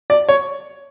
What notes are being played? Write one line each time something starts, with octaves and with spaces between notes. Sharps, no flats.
D5
C#5